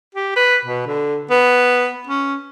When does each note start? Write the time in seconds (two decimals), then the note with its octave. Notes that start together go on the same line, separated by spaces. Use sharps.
0.15 G4
0.36 B4
0.65 B2
0.87 D3
1.30 B3
2.07 C#4